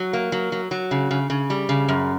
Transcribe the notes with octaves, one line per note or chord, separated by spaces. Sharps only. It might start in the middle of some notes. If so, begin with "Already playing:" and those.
Already playing: F#3
A#3
F#3
F#3
F#3
C#3
C#3
C#3
G3
C#3
F#2